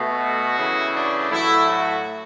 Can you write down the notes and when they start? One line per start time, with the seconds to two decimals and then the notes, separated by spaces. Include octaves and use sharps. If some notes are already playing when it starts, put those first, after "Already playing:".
Already playing: B2 A3
0.20 F#4
0.57 C#3 E3 A3
0.94 D4
1.31 A2 F#3 A3 E4
1.68 F#4